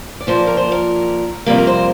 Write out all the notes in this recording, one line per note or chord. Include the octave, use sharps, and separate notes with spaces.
D5
A#2 F3 A#3 C5
A#4
C5
A#4
F2 C3 G3 A#3 A#4
A#4
C5